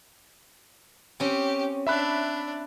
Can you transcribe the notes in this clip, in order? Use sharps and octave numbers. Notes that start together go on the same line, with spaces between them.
C4 C#4 G4
D4 E5 B5 F#6